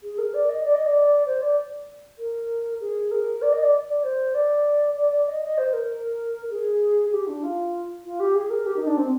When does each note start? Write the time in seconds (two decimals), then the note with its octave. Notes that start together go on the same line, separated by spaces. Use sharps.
0.03 G#4
0.18 A#4
0.33 D5
0.49 D#5
0.64 D5
0.74 D#5
0.85 D5
1.26 C5
1.41 D5
2.18 A#4
2.80 G#4
3.11 A#4
3.41 D5
3.52 D#5
3.62 D5
3.88 D5
4.03 C5
4.34 D5
4.96 D5
5.11 D5
5.27 D#5
5.42 D#5
5.57 C5
5.73 A#4
6.50 G#4
7.11 G4
7.27 D4
7.42 F4
8.04 F4
8.19 G4
8.35 G#4
8.50 A#4
8.66 G4
8.76 D#4
8.86 D4
8.97 C4